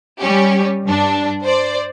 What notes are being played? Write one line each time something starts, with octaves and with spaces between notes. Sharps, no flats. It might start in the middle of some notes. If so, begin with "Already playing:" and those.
G3 C#4 G4
G2 D4
C5 D5